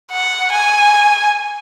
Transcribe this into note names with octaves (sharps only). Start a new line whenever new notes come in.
F#5
G#5